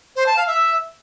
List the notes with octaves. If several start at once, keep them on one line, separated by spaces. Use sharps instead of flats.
C5
A5
F5
E5